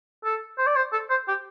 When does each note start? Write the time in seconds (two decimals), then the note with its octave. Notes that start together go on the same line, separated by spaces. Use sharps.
0.24 A4
0.58 C5
0.66 D5
0.76 C5
0.92 A4
1.10 C5
1.28 G4